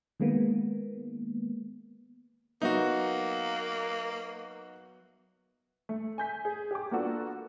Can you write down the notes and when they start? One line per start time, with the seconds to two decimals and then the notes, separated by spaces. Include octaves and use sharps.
0.20 D#3 G#3 A#3 B3
2.62 F#3 A#3 B3 D#4 F#4 E5
5.89 A3
6.18 G#5 G6 B6
6.45 G#4
6.71 G4 D6
6.91 A#3 B3 D4 F4 F#4 A4